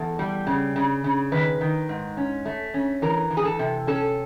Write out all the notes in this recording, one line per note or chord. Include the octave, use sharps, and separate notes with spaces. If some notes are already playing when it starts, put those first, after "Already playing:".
Already playing: E2 A4
G3
C#3
C#3
C#3
D#3 B4
D#3
G#2
C#4
A3
C#4
E3 A#4
E3
G#4
A4
C3
C#4 A4